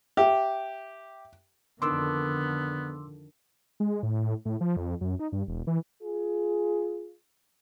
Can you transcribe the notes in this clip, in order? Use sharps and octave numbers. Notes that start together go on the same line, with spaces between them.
G4 E5
F2 D3 D#3 B3 D4 C6 D6 E6
G#3
A2
A2
F3
F2
F#2
D#4
G2
E1
E3
F4 G#4